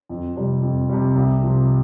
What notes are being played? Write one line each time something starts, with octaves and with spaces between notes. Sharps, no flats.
F2
C3 G3
F2
C3 G3
C2
C3 F3